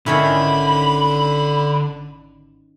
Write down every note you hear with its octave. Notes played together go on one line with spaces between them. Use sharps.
G#1 D3 D#3 C#4 E4 B5